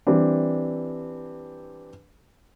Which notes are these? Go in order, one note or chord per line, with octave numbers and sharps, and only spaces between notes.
E3 G3 C4 D4